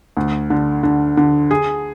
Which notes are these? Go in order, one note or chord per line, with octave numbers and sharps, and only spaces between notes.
D2
D3
D3
D3
G#4